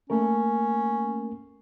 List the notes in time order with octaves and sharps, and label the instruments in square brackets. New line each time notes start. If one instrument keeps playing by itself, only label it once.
[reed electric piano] A3 A#3 A#4 [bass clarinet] C#4